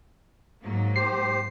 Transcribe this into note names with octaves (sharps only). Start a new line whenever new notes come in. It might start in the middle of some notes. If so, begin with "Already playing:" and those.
G#2 F#3 A#3
G4 C5 C7